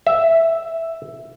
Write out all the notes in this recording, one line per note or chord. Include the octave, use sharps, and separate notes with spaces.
E5